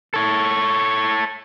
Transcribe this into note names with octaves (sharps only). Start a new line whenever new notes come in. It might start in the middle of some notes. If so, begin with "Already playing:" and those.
A4 C#5